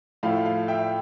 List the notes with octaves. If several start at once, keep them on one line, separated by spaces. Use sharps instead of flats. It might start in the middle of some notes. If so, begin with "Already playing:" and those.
A2 F3 A3 F5
F5
E5 G5